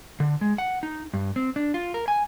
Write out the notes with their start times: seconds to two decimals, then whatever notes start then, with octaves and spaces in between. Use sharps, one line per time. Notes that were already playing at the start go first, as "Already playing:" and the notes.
0.20 D3
0.41 G#3
0.58 F#5
0.83 D#4
1.13 G2
1.36 C4
1.56 D4
1.74 F4
1.94 A#4
2.08 G#5